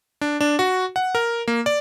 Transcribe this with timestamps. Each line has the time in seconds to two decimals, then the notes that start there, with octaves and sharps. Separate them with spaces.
0.21 D4
0.41 D4
0.59 F#4
0.96 F#5
1.15 A#4
1.48 A#3
1.66 D5